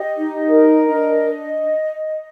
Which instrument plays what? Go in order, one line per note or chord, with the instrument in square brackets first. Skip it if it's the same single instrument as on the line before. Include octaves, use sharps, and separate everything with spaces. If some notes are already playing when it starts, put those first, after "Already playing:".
Already playing: [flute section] G4 D#5
D#4
A#4
D4 D#5